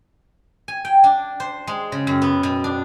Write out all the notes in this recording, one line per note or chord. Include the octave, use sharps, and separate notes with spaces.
G#5
G5
D4
C5
G#3
C#3
F#2
B3
B2
D4